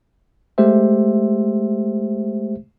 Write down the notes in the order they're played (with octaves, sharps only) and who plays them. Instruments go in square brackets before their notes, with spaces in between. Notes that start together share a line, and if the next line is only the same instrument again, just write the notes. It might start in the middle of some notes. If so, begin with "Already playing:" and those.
[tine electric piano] G#3 A3 G4 C5 E5